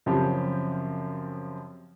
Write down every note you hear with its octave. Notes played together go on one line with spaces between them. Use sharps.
F#2 C#3 F3 C4 G4